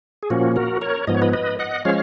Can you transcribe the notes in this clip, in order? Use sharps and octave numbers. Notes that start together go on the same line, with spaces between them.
G#4
A#2 F3 A#3 C#4 F#4
F#4 A#4
A#4 C#5
G#2 F3 B3 D#5
C#5
B4 D#5
B4 D#5
D#5 F#5
F3 G#3 C#4 C#5 F5